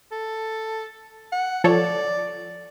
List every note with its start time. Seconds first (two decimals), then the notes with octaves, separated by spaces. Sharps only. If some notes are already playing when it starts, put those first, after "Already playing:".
0.12 A4
1.32 F#5
1.64 F3 A4 C#5 D5